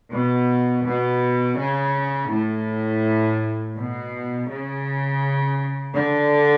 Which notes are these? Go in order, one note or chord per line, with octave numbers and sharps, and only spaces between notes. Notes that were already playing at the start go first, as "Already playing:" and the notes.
B2
B2
C#3
A2
B2
C#3
D3